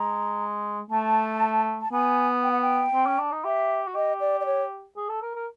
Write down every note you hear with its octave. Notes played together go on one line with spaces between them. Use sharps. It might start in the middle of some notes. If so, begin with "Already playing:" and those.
Already playing: G#3 A#5
A3 A5
A5
B3 G#5
G5
F#5
G5
C4
C#4
D4
D#4
G4 E5
F#4
G4 D#5
D5
D5
C#5
G#4
A4
A#4
A#4